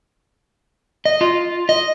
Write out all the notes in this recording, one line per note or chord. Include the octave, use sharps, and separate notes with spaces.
D#5
F4
D#5